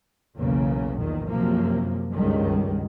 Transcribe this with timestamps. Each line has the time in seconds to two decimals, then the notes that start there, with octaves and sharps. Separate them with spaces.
0.39 B1 E2 C#3 A#3
0.99 E2 A#2 D#3
1.29 F#2 C3 F3 A#3
2.13 C#2 G2 D#3 G3 G#3